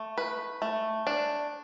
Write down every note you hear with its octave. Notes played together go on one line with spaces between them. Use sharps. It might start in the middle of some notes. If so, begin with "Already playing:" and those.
Already playing: A3
B4
A3
D4